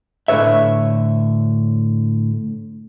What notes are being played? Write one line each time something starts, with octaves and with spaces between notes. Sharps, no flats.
A2 D3 B4 C#5 E5